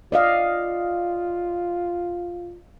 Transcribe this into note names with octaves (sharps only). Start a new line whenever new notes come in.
F4 D5 D#5 F5